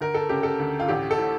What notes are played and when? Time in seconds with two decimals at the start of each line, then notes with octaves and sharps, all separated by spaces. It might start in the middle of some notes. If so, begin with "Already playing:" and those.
0.01 D2 A#4
0.15 A4
0.29 C#3 G4
0.43 A4
0.59 D2
0.80 F4
0.88 A1 G4
1.11 A4
1.18 A2